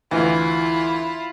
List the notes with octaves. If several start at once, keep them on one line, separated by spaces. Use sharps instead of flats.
D2 E3 E4 F4